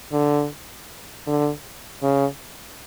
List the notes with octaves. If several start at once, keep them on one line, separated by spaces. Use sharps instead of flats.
D3
D3
C#3